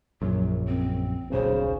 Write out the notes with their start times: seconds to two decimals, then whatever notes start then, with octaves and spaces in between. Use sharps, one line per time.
0.22 A#1 F#2 F#3
0.68 C4
1.32 D#1 B1 C#3 C5